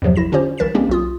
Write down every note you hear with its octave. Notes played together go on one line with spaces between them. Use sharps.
E2 G2 C3 F3 F#3
A1 E4 A#6 E7
D3 C#4 D4 F4 G4 C5
C2 E3 A#4 A6 B6 E7
G3 G#3 A#3 C4 C#4 G4
B1 F4 D#6